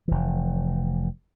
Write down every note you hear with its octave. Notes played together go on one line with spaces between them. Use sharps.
F1 E3